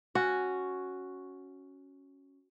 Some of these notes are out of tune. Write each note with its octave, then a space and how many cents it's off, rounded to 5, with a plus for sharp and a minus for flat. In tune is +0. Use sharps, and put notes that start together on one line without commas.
C#4 +0 F#4 +0